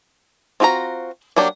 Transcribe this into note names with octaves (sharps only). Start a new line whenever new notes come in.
C4 F4 F#4 E5 A#5
F#3 A#3 D4 G4